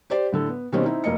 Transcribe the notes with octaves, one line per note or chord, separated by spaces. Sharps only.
G4 C5 D5
A2 D3 A4
B3
B2 D#3 G3 A#3 C4 C#4
C4 D#4 E4
F1 A#3 D#5 C#7